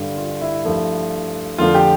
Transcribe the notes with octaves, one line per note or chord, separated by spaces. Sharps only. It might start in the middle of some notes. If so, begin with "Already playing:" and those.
Already playing: G2 D3 G3
F4
E4
G2 F3 A3
F2 D3 F3 A3 F4
G4